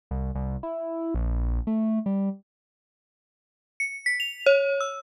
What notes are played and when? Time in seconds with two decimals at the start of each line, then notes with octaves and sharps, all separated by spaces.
0.11 C2
0.35 C2
0.63 E4
1.15 A#1
1.67 A3
2.06 G3
3.80 C#7
4.06 B6
4.20 F7
4.46 C#5
4.81 E6